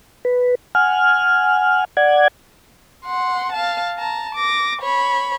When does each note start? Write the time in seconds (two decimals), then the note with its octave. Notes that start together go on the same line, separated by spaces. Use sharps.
0.25 B4
0.75 F#5 G#5 F6
1.97 D5 F#5 G#6
3.05 F#5 C6
3.52 F5 A5
3.98 A5 A#5
4.35 D6 A#6
4.81 C#5 B5